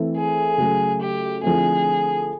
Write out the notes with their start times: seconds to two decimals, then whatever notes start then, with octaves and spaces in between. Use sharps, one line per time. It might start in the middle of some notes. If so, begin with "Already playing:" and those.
Already playing: E3 A3 C4 E4 A4
0.16 G#4
0.58 C#3 F#3 A3
1.01 G4
1.43 D3 F3 A3 C4 E4 G#4